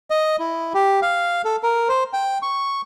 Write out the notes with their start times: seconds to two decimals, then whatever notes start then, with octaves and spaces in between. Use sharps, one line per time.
0.10 D#5
0.40 E4
0.74 G4
1.02 F5
1.45 A4
1.63 A#4
1.89 C5
2.13 G5
2.42 C#6